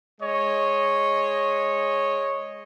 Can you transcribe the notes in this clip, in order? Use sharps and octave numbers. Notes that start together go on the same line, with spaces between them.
G#3 C#5 D#5